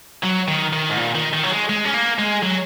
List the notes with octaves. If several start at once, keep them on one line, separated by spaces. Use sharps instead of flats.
F#3
D#3
D#3
G#2
A#2
D#3
D#3
F#3
G#3
G#3
C#4
A#3
G#3
F#3